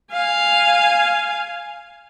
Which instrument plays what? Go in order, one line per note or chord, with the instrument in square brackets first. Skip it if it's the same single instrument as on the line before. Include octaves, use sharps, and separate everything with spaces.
[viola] F5 G#5